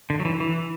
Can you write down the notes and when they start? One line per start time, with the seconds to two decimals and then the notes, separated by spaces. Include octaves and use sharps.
0.10 D3
0.20 F#3
0.25 E3
0.40 E3